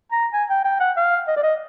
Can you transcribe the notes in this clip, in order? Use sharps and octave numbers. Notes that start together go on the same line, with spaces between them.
A#5
G#5
G5
G5
F#5
F5
D#5
D5
D#5